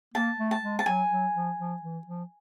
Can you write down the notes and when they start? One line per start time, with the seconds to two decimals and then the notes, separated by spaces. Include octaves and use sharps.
0.14 A#3 A5
0.39 A3
0.51 A5
0.62 G#3
0.79 A5
0.86 F#3 G#5
1.10 F#3
1.34 F3
1.58 F3
1.82 E3
2.07 F3